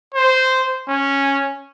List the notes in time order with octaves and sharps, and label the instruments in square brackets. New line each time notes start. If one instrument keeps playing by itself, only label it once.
[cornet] C5
C#4